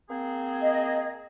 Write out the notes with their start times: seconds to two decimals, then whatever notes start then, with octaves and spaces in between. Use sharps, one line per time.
0.10 A#3 C4 G#4
0.60 D#5